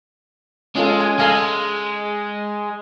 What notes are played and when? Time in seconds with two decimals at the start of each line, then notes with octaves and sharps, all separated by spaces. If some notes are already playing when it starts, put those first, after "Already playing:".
0.76 G#3 C#4 F4 A4
1.00 G#5
1.19 G#3 A4 F5 G#5